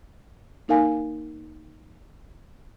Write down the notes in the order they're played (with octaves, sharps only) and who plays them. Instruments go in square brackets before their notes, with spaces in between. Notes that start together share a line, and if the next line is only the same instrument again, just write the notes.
[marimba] A#3 D#4 A#4 F5 G#5